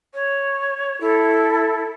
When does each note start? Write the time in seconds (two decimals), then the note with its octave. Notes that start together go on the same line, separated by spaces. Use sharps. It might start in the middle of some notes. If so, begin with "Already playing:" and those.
0.14 C#5
1.00 E4 A4